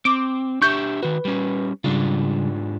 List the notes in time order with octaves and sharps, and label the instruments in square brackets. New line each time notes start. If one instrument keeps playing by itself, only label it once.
[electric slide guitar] C4 [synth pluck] D6
[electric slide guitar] D4 G4 E5 [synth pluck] C#6 G6
[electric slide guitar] D#3 F#4 [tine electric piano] B4
[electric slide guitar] G3 C#4
[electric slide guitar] G#2 D4 F4 [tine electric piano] C#3 G3